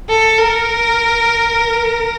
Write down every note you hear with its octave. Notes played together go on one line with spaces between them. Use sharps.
A4
A#4